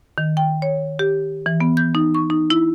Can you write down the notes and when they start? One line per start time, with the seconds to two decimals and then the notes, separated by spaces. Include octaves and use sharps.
0.18 D#3
0.37 G5
0.62 C#5
0.99 G4
1.46 E3
1.60 B3
1.77 G6
1.95 D#4
2.15 C#6
2.30 D#4
2.50 E4